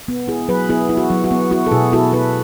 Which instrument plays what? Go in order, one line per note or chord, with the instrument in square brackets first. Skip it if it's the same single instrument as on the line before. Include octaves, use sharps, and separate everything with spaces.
[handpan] B3
E4 G#4
F#3 G#4 B4
B3 E4 G#4
E4
F#4
F#3
F#4
B3
E4 F#4
A4
B2 E4 G#4
E4 F#4 A4
E4 G#4 B4